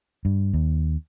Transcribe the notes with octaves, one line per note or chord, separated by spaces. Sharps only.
G2
D#2